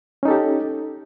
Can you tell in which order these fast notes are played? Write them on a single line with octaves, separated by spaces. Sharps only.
C#4 D#4 A4 G4